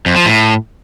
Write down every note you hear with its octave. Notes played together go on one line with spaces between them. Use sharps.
F2
F3
A2